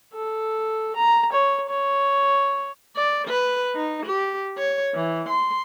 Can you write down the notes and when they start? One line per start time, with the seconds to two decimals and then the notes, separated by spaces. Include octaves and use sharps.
0.14 A4
0.96 A#5
1.32 C#5
1.70 C#5
2.96 D5
3.28 B4
3.76 D#4
4.06 G4
4.58 C#5
4.95 E3
5.29 C6